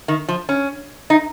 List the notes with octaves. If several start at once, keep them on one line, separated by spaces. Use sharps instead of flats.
D#3
F3
C#4
D#4